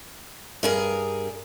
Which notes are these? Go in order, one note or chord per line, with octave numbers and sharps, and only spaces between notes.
G2 G#4 A#4